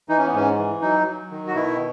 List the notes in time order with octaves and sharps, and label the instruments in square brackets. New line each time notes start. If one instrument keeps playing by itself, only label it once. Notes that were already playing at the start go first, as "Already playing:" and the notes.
[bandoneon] E3 D#4
C#4
B3
G#2 C#4
E3
F#3 D#4
F#3
D#3
F#4
B2 E4